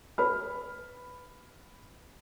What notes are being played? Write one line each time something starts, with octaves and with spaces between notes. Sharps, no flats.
B4 B5 F6